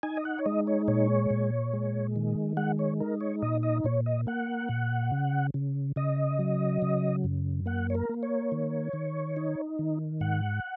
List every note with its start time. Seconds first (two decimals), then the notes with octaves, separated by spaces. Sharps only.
0.03 D#4 G#5
0.17 D#5
0.25 F#5
0.39 C#5
0.46 G#3 D#5
0.67 C#5
0.88 A#2 C#5
1.30 A#2
1.73 G#3
2.16 D#3
2.57 G#3 F#5
2.79 C#5
3.00 D#4 A#4
3.21 C#5
3.42 A#2 D#5
3.63 D#5
3.84 A#2 C#5
4.06 D#5
4.27 A#3 F#5
4.69 A#2
5.12 C#3
5.54 C#3
5.96 C#3 D#5
6.39 F#3
6.82 C#3
7.24 F#2
7.66 A#3 F#5
7.90 C#5
7.95 A#4
8.09 A#3
8.23 C#5
8.52 D#3
8.93 D#3
9.37 D#4
9.79 D#3
10.21 G#2 F#5